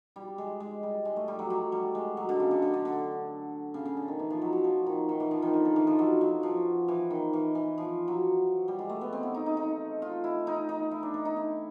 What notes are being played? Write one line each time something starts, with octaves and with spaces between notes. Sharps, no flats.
G3
G#3
G#3
G3
G#3
A3
G3
F#3
F#3
G3
G#3
F#3
D3
C#3
D3
D3
D3
D3
C#3
C#3
D3
D#3
E3
F3
F#3
F#3
F3
D#3
D#3
E3
F3
D#3
D3
D#3
E3
F3
F#3
F#3
F3
E3
D#3
E3
E3
F3
F#3
G3
G#3
A3
B3
C4
E4
D#4
D#4
D#4
F4
E4
D#4
D#4
E4
D4
D#4
D#4
E4